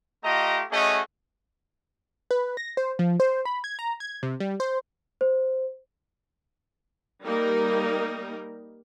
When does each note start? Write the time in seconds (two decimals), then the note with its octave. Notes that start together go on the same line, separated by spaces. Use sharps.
0.24 A3 F4 G4 D#5 A#5
0.72 A3 C#4 F#4 G#4 D#5
2.31 B4
2.57 A#6
2.77 C5
2.99 F3
3.20 C5
3.45 B5
3.64 G#6
3.79 A#5
4.00 G#6
4.23 C3
4.40 G3
4.60 C5
5.21 C5
7.23 G3 A#3 D#4 A#4